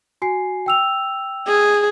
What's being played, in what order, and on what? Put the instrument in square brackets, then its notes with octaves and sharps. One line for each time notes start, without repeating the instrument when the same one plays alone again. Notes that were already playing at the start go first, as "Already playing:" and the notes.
[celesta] F#4 G#5 C7
G5 E6 F7
[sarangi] G#4